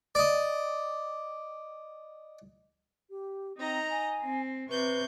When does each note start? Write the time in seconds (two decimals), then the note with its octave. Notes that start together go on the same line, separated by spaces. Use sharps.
0.15 D5 D#5
3.10 G4
3.57 C4 D#4 D#5 A#5
3.91 G#5
4.21 C4
4.70 C3 B4 C#6 G6